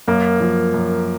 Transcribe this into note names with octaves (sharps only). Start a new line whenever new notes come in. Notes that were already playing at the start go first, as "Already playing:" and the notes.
F#2 A#3
F3
F#2